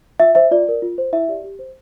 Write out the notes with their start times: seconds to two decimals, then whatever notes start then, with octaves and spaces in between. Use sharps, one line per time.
0.20 F4 E5
0.35 C5 E5
0.51 F4 D5
0.66 A#4 D5
0.82 F4
0.98 C5
1.13 E4 E5
1.29 G4 D5
1.44 G4
1.59 C5